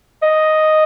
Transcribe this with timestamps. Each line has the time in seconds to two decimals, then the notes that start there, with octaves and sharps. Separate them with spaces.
0.22 D#5